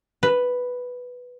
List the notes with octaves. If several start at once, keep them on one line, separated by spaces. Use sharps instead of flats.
B4